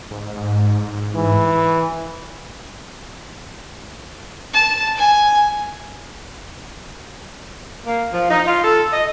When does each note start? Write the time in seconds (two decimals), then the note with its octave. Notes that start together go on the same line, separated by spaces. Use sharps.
0.11 G#2
1.15 E3
4.53 A5
4.96 G#5
7.85 A#3
8.13 F3
8.30 D#4
8.47 F4
8.64 A4
8.93 D#5